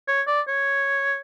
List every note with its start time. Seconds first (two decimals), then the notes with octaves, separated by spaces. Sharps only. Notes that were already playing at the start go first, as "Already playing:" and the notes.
0.08 C#5
0.27 D5
0.48 C#5